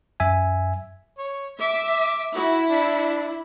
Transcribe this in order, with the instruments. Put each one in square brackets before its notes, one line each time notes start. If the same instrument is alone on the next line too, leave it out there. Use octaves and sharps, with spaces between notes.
[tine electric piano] F#2 E5 G#5
[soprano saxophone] C#5
[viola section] E5 [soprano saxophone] D6
[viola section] E4 [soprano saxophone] F#4
[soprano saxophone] D4